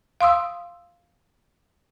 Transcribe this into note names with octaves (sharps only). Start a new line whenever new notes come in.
F5 C6 D#6 E6